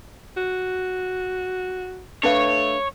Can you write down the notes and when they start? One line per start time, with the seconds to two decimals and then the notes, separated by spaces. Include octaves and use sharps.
0.37 F#4
2.23 A3 D4 B4 C#5 F5